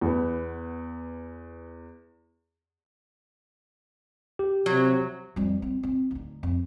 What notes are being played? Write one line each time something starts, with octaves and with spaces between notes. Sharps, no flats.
E2 B3
G4
C3 F#3
F2 G3
C4
C4
D2 D#4
F2